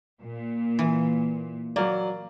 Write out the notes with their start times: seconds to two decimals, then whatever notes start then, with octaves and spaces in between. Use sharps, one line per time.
0.21 A#2
0.79 E3
1.76 F#3 A#3 D5